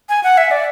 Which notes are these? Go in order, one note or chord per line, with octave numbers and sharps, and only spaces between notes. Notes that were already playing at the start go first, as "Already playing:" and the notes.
G#5
F#5
E5
D5